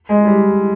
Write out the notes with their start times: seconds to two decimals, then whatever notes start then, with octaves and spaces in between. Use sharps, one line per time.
0.09 G#3
0.25 G3